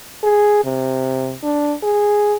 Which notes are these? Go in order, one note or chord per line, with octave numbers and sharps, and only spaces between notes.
G#4
C3
D4
G#4